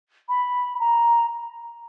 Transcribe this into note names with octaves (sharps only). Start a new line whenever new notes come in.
B5
A#5